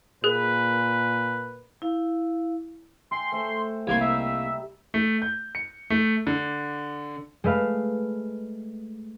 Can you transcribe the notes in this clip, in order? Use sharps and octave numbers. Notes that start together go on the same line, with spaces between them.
A#2 G#4 A#4 B4 F#6
E4 F5
E5 G5 G#5 C6
A3 C5 E5
C2 G3 A#3 C6 G#6
D#4 E5
A3
G6
C#7
A3
D3
G#3 A3 B4 F5